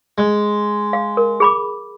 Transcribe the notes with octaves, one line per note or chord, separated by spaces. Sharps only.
G#3
F5
A#4
G#4 B5 D6